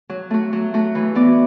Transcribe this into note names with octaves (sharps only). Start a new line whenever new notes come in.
F#3
A3 F#4
F#3
A3 F#4
E3
B3 F#4 D5